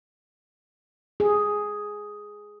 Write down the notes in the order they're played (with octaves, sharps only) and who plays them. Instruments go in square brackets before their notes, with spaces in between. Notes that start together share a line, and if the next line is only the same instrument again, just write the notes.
[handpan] G#4